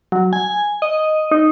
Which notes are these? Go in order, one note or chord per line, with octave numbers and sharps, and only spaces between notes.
F#3
G#5
D#5
D#4